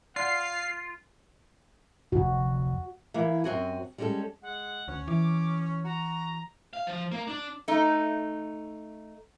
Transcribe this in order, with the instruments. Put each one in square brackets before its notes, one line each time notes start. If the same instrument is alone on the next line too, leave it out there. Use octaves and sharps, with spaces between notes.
[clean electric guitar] F4 [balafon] D5 F#5 [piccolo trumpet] F5 [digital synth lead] C7
[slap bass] F1 D2 [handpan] F#4
[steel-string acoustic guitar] E3 A#3 E4
F#2 C4 F#4 G#5
G3 G#3 C#4 F#4 A4
[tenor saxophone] G#3 [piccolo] F#5
[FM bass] D2 [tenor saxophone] C#4
[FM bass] E3 [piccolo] D6
[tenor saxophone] F#4 [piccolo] A#5
[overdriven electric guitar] F5
F3
A#3
D4
[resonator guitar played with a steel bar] A3 D#4